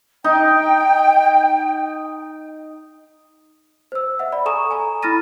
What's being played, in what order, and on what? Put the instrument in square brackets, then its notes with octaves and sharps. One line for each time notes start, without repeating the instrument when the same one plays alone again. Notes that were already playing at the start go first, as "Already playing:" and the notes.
[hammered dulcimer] D#4 [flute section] G5
[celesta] C5 E6
E5 F#5
D5 B5
A4 G#5 A#5 C#6 D#6 E7
G#5 A#5
E4 B5 F6 A6 A#6 D#7